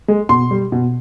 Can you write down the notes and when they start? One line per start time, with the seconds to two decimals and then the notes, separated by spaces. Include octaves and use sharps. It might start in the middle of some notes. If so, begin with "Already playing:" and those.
0.08 G#3
0.29 B2 C6
0.51 G3
0.72 B2